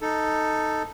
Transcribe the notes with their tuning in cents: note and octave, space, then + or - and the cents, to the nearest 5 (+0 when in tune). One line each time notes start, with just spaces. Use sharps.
D#4 +0 A4 +5